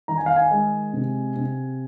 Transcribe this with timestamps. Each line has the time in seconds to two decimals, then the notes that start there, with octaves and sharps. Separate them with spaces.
0.08 D#3 A#5
0.18 G#5
0.26 F5
0.36 G#5
0.51 G#3
0.93 C3
1.36 C3